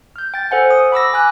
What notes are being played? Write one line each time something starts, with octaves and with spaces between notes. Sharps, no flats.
F6 G6
G5 A6
A4 C5 F#5 G#5
D#6
B5 D6 E6 A#6
G#5 D6 F#6